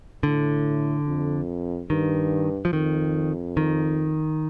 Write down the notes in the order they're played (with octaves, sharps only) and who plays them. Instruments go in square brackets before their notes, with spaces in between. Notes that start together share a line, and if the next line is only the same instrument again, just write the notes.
[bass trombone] A2 [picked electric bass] D3
[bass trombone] F2
[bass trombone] G2 [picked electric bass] D#3
[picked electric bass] F3
[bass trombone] F2 [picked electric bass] D#3
[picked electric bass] D#3